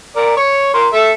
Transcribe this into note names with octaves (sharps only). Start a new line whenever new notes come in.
A#4 D5
C#5 C#6
A#4 C6
A4 E5